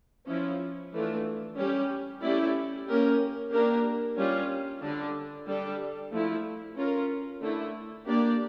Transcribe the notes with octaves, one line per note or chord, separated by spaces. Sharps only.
F3 C#4 E4
E3 A3 D4 F4
G3 C#4 G4
A3 C#4 E4 G4 D5
A#3 C#4 G4 A#4
A#3 D4 G4 A#4
G3 C#4 F4
D3 G3 D4
G3 D4 A4
F3 A3 E4
C#4 F4 A#4
D3 A3 E4
A#3 D4 G4 D5